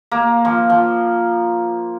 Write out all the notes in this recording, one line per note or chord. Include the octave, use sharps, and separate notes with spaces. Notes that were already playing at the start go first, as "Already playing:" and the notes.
A#3
F3
F3